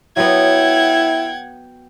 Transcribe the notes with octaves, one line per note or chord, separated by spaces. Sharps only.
F#3 B3 E4 F#5 G5 G#6